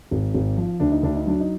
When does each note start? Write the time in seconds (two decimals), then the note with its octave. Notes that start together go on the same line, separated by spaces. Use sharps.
0.11 G#1
0.34 G#1
0.57 F3
0.80 D2 D4
0.92 D#4
1.03 D2 D4
1.16 D#4
1.26 F#3 D4
1.40 D#4